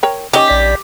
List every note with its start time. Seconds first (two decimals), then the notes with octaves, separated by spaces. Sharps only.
0.03 A#4 C#5 G5
0.33 D#3 C#4 G4 D#5
0.48 A#1 D5 B6